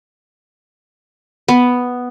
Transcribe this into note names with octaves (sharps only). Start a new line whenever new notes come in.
B3